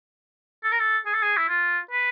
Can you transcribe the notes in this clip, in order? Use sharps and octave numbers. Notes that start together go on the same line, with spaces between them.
A4
A#4
A4
G#4
A4
G#4
E4
F4
B4